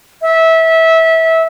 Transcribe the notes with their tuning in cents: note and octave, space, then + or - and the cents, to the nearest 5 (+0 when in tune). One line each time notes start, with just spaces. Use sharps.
E5 -20